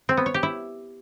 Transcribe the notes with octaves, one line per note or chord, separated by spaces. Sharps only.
C4
B3
C#5
G4
E4